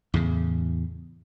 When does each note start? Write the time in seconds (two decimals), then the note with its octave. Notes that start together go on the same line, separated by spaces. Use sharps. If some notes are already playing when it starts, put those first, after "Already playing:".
0.14 E2 A2 C#3